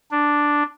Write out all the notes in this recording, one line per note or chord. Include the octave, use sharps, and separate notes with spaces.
D4